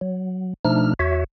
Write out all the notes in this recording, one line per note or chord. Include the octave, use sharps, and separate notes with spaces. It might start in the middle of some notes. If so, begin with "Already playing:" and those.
F#3
B2 F3 A3 D4 D#4 F6
E2 F#4 C#5 E5